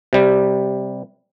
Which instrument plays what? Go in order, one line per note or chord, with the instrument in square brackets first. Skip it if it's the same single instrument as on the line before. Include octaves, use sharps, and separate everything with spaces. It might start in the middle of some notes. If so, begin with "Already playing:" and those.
[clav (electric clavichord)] C3 G3